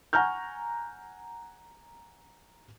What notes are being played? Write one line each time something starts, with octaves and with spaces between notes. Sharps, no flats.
F#5 G#5 A#5 C#6 F6 G6